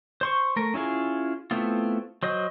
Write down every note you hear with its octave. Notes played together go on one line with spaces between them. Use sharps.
C5 C6 C#6
A3 A#4
C#4 E4 F4 G#4
A3 B3 C4 E4 F4
F#3 C5 D#5